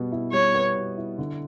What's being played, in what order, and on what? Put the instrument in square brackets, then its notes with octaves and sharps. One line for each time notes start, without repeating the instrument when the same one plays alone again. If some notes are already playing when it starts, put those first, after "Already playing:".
Already playing: [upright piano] B2 G3 B3
E4
[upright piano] G3 [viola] C#5
[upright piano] B3
B2
E4
D3